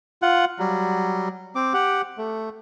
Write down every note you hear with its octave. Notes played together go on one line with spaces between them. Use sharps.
F4 F#5
F#3 G3
C4 D6
G4 F#5
A3